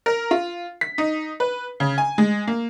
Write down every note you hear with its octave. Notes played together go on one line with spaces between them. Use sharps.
A#4
F4
B6
D#4
B4
C#3
G#5
G#3
A#3